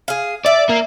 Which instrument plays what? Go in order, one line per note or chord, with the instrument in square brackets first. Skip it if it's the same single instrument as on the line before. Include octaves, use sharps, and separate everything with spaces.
[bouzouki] G#4 F5
[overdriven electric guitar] D5 [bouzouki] E5
[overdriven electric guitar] A#3